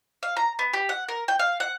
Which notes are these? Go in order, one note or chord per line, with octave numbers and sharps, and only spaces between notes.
F5
A#5
B3
G4
F#5
A#4
G5
F5
F#5